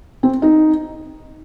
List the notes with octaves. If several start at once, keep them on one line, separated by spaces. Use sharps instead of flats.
C4
D#4